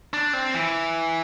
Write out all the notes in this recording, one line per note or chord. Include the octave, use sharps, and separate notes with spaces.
D4
C4
E3